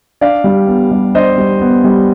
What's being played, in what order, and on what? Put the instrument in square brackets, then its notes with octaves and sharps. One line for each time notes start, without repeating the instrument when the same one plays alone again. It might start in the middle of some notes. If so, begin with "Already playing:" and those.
[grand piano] D4 D5 F5
G3
B3
G3
D4 C5 D#5
G3
B3
G3